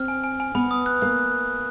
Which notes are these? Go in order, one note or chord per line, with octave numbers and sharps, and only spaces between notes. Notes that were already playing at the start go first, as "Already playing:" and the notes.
Already playing: C4 F6
G#5
G#5
G#5
B3 B5
D#6
F#6
A#3 F#6